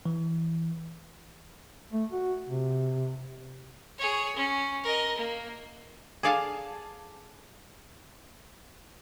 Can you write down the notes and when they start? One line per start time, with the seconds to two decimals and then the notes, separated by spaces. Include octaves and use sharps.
0.06 E3
1.93 A3
2.12 F#4
2.49 C3
3.98 G#4 C#5
4.36 C#4
4.83 A#4 D#5
5.18 A#3
6.23 G#4 A4 D5 F5 G#5 A5